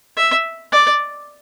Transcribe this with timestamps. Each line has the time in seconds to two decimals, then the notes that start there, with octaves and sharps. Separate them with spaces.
0.17 E5
0.72 D5